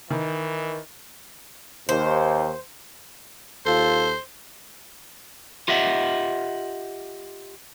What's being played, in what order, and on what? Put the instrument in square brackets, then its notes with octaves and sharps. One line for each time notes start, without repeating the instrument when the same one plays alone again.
[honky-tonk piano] D#3 [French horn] E3
[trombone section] D#2 [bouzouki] C5
[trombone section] D#2 F4 A4 [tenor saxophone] C5
[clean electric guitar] F4 G4 D#5 E5 F#5